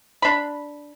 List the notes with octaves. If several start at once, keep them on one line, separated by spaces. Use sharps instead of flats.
D4 B5